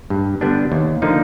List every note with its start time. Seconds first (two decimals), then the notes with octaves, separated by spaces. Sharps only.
0.10 G2
0.41 D3 G3 B3 D4
0.72 D#2
1.02 D3 F3 A#3 D#4